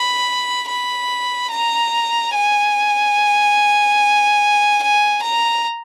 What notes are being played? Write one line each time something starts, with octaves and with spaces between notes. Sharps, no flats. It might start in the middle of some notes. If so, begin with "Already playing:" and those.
Already playing: B5
B5
A#5
G#5
G#5
A#5